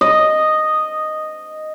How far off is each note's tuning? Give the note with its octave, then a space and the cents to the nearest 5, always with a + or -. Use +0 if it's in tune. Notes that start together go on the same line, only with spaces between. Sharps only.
D#5 -5